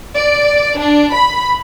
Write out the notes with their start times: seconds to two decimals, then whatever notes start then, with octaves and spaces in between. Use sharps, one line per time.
0.15 D5
0.78 D4
1.12 B5